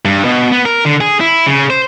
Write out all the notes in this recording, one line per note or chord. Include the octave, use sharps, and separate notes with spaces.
G2
B2
B3
A#4
D3
G#4
E4
C#3
C5